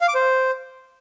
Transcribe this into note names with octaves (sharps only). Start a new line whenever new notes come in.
F5
D6
C5